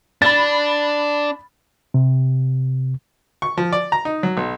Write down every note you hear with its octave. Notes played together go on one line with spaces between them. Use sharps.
D4 B5 A6
C3
C#6
F3
D5
A#5
D#4
F#3
B1